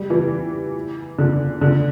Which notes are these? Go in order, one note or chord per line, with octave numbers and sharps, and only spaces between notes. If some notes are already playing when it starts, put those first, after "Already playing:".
Already playing: G3
E3
D3
D3